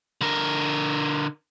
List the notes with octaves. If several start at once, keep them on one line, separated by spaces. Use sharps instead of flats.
D3 A#4